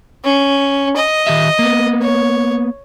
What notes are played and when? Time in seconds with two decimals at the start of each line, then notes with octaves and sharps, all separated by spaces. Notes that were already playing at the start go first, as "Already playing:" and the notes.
0.24 C#4
0.96 D#5
1.27 D#3 G4 E5
1.59 A#3 B3
2.02 C#5